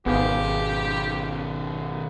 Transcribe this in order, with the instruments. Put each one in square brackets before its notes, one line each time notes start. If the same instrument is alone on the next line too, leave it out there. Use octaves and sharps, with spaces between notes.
[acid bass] G#1 [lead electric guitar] B2 D#3 [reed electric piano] B3 G#4 F5 [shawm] G4